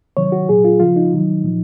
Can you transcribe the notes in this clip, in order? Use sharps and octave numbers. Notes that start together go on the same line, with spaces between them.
C3 D#3 F#3 C#5
F#4
A#2 F#3 G#4
F4
C#3 F3 F4
D#4
C3 D#3 F#3
A#2 F3